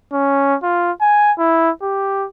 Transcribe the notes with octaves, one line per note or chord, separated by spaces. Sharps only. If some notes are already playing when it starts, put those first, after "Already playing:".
C#4
F4
G#5
E4
G4